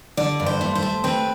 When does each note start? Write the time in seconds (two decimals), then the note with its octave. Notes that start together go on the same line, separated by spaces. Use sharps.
0.17 D3 D5
0.40 G2
0.46 C5
0.61 A3
0.75 C5
0.83 A3
1.04 C4 B4